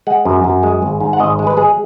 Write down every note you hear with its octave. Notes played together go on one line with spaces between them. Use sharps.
G#3 F#5
F#2
F#2
G#3
G#1
G#2
F#5
G#1 D#5
G#3
B4
G#3 G#4